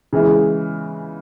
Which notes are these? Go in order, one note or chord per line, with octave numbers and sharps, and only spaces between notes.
C#3 E3 G#3